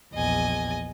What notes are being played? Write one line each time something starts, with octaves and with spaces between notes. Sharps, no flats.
A#1 E2 D#5 G#5